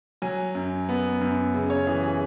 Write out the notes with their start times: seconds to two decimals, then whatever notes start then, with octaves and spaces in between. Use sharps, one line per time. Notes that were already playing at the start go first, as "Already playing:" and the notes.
0.22 F#3 G#5
0.55 F#2
0.89 B3
1.21 F#2
1.54 C#3
1.70 C#5
1.87 E3 G#4
2.03 G#4